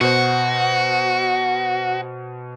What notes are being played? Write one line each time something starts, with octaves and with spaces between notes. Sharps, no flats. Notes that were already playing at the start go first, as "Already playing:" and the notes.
B2 F#4 C5